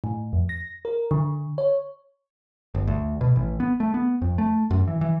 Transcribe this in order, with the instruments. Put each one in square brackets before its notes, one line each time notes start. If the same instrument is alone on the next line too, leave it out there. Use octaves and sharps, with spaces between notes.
[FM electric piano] A2
F2
A#6
A#4
D3
C#5
[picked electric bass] G1
D2
B2
A1
B3
A3
B3
F2
A3
F#2
E3
E3